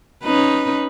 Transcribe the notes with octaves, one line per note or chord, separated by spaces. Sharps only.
C#4 D#4 B4